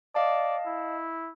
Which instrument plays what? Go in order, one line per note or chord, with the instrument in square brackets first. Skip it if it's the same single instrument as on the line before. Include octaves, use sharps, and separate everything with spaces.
[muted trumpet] D5 [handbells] D#5 F5 A5
[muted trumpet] E4